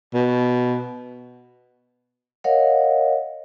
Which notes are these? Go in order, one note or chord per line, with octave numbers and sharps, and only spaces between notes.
B2
A#4 C#5 D#5 F5 F#5